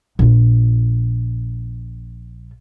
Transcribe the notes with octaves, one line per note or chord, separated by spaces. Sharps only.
A#1 F4